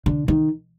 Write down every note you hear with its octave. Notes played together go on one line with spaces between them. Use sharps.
D3
D#3